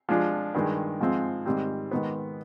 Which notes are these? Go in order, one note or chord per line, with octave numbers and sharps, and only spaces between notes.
F3 G#3 D4
G2 D#3 G#3
G#2 F3 G#3 C4 F4
G#2 D#3 G3 C4
G#2 D#3 B3